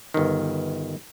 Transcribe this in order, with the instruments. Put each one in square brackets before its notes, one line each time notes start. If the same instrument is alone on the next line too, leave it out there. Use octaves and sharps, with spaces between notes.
[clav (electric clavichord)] G1 D#3